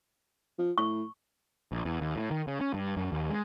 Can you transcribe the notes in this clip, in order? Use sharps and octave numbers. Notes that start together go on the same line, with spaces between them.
F3
A2 C#6
A#1
E2
D#2
A2
D#3
C#3
C#4
G2
F#2
D#2
G#3